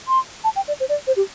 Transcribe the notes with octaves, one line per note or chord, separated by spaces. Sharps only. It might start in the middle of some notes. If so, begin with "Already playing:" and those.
C6
A5
G5
D5
C5
D5
C5
G4